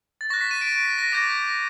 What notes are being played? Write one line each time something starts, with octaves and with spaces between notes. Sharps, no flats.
A6
C#6 F#6 A#6
B6
D#7
D7
D7
B6
A#6
D6 G6 A#6